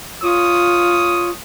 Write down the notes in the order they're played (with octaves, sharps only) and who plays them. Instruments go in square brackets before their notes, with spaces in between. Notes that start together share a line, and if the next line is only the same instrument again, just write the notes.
[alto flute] F4 [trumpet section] C#5 D#6